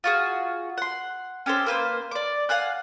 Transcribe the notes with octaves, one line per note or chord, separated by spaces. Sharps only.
F4 F#4 G#4
F#5 C6
C#4 G4 A4 C5
A#3 B4 C5
D5 D6
F5 F#5 G#5 F#6